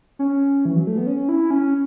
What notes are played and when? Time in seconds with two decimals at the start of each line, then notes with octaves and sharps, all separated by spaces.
0.19 C#4
0.66 E3
0.76 F#3
0.87 A3
0.97 B3
1.07 C#4
1.29 E4
1.51 C#4